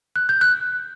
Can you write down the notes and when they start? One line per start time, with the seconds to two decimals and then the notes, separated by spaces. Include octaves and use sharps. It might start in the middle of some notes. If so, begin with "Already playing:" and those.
0.16 F#6
0.29 G6
0.41 F#6